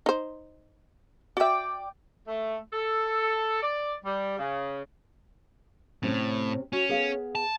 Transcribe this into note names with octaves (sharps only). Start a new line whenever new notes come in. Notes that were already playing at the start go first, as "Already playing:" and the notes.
D#4 C5
F#4 D5 E5 G5
A3
A4
D5
G3
C#3
A2 C3 C4 C#4
C#4 F#4
B3 G#4 F5
A5